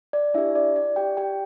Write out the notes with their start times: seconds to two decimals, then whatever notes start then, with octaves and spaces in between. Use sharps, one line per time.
0.13 D5
0.34 D4 E4 G4 E5
0.55 D5
0.76 D5
0.96 G4 G5
1.17 G4 G5